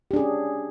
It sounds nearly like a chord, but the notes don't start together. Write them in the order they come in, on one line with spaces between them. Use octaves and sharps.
G4 D4 G#4 C#4